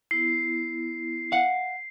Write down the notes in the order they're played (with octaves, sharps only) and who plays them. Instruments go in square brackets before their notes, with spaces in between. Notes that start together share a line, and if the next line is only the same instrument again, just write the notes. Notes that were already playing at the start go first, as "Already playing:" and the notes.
[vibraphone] B3 E4 [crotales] C7
[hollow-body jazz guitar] F5 F#5